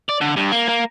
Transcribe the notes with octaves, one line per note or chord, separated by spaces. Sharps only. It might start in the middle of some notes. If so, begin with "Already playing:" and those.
D5
D3
G2
A#3
A#3